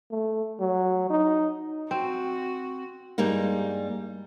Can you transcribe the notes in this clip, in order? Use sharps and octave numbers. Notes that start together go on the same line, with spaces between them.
A3
F#3
D#4
C4 F#4
G2 G3 G#3 A#3 D#4